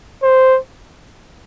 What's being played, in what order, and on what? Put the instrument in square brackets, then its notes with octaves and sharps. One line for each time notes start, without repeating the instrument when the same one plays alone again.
[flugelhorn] C5